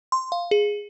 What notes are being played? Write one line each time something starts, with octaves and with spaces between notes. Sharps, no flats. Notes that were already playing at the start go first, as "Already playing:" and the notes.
C6
F5
G#4